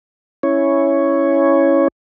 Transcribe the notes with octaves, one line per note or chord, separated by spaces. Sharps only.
C#4 E4 C#5